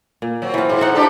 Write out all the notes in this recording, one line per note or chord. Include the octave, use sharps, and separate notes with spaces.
A#2
F#3 C4
E3 F4
G#2
D#4 F#5
D4 G4 A4